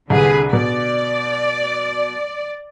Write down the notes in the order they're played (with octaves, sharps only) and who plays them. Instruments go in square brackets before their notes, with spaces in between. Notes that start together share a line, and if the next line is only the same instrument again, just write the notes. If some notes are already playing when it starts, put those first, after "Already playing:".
[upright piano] C2 [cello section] D3 G#4 B4
[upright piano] B2 [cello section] D5